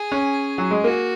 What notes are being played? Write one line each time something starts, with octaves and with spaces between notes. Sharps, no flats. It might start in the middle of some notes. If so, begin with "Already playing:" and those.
Already playing: G#4
C#4
F#3
G#3
A#3 F#4